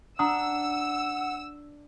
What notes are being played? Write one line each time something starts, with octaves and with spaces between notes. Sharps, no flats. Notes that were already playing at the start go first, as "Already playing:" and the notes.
D4 F#5 A#5 D#6 E6